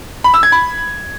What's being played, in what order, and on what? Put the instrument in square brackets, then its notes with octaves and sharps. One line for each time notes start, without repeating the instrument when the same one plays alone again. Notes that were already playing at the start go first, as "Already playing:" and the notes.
[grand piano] B5
E6
G#6
B5